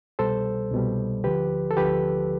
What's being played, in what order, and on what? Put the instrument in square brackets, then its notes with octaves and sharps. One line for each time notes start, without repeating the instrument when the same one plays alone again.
[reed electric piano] C2 B2 G3 A4 C5
C2 B2 G3
D2 D3 F3 G4 B4
A4
D2 D3 F3 G4 B4